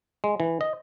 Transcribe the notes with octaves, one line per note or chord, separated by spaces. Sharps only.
G#3
E3
D#5